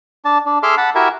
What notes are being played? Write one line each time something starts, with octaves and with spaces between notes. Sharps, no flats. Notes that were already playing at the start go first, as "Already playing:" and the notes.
D4 A5
D4
G#4 A4 E5 C6 D6 F6
F#5 A5 B5
E4 F#4 G4 A#4 E5 G#5